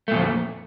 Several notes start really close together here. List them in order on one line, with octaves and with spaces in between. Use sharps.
A3 A#2 F2